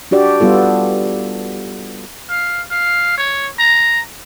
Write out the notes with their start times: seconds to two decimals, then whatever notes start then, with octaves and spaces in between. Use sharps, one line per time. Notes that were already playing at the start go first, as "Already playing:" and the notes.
0.11 D4 F#4 G4 D5
0.40 G3 B3 F4 A4
2.29 F5
2.71 F5
3.17 C#5
3.59 A#5